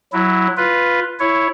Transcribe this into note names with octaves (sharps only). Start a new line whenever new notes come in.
F#3 E4
F4 B4
E4 C#5